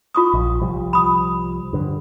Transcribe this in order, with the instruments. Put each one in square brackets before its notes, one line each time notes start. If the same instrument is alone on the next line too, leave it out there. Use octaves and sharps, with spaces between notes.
[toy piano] F4 C#6 D#6
[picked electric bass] A#1
C2 F3 G3
[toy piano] B5 D#6
[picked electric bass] G2 D3